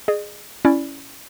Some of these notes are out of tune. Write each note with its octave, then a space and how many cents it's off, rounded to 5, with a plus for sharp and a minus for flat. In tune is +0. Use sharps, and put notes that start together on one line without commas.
G#4 +0 D#5 -45
C#4 +0 E4 +0 D5 +0